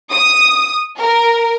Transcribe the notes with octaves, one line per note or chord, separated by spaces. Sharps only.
D#6
A#4